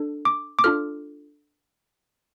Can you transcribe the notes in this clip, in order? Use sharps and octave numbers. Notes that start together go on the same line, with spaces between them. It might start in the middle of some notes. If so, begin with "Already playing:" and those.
Already playing: D4 A4
D6
D6
D4 F4 A4 F6